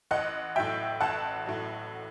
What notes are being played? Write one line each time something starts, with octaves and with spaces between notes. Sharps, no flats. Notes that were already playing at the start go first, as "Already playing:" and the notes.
A1 D#5 F#5
A2 F#3 E5 G5
A1 F#5 A5
A2 F#3